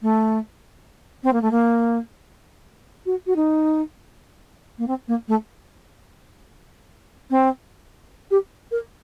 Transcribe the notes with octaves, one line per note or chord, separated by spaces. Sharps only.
A3
C4
A#3
A3
A#3
F#4
F#4
D#4
A#3
C4
A#3
A3
C4
G4
A#4